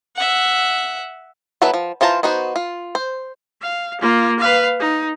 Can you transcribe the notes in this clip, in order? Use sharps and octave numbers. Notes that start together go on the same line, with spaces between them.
E5 F#5
F#3 B3 E4 A4 B4
F3
E3 F4 C5 A5 A#5
B3 D#4 F#4 C5
F4
C5
F5
A#3 F4
B4 F5
D#4